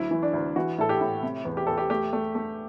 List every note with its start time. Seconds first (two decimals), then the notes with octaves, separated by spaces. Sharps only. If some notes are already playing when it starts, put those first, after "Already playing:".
Already playing: D2 F#3 E4
0.11 E3
0.22 D4
0.33 D2
0.56 E3 F#4
0.78 A2 A4
0.89 G4
1.01 A2
1.23 C3
1.45 E2
1.57 G4
1.67 E2 A4
1.78 G4
1.90 A3 G4
2.13 A3
2.35 A3